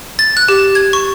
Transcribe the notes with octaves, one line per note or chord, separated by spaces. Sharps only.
A6
F#6
G4
G#6
C#6